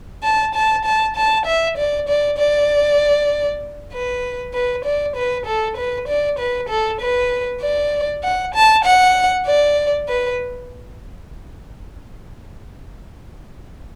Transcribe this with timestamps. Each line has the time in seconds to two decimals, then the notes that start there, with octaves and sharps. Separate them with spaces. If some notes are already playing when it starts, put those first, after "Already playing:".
0.23 A5
0.55 A5
0.85 A5
1.16 A5
1.46 E5
1.77 D5
2.08 D5
2.38 D5
3.93 B4
4.54 B4
4.85 D5
5.16 B4
5.46 A4
5.77 B4
6.08 D5
6.39 B4
6.69 A4
7.01 B4
7.61 D5
8.23 F#5
8.54 A5
8.85 F#5
9.46 D5
10.08 B4